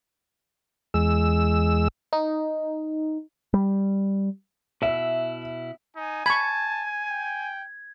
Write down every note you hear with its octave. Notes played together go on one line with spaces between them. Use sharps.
E2 G#3 E6
D#4
G3
B2 E4 E5
D#4 G#5
A5 B5 C#6 G#6
G5